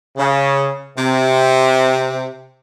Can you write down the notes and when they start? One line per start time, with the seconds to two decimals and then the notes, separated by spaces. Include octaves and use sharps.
0.17 C#3
0.97 C3